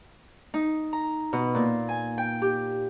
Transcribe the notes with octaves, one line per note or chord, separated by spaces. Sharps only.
D#4
A#5
B2
A#2
G#5
G5
G4